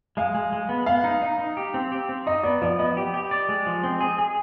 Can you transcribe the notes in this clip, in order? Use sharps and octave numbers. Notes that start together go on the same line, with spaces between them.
G#3 F5
G#3
G#3
B3
B3 F5
D#4
D#4
D#4
G4
C4
G4
C4
D#4 D#5
B3 D5
F3 D5
B3 D#5
G4
G4
D5
G#3
F3
C4
G#4
G#4